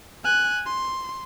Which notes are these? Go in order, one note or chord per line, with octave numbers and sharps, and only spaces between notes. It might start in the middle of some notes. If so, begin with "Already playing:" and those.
G#5 F#6
C6